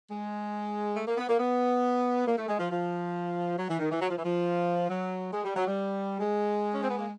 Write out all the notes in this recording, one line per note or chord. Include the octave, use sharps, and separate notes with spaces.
G#3
A3
A#3
B3
A#3
B3
A#3
A3
G#3
F3
F3
F#3
E3
D#3
E3
F#3
F3
E3
F3
F#3
G#3
G3
F#3
G3
G#3
C#4
C4
B3
A#3